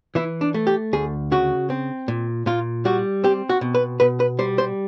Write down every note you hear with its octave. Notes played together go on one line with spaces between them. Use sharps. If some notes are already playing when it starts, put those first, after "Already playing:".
E3 E4
D4
A3
G4
D2 G#4
C#3 F#4
C4
A#2
A#2 F4
G3 F#4
C4 G4
F#4
B2
B4
B2 B4
B4
G3 C5
C5